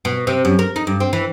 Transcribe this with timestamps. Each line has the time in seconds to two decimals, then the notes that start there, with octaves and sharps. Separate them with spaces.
0.05 B2
0.27 C3
0.45 F#2
0.59 A#4
0.76 D#4
0.87 G2
1.00 C4
1.13 E3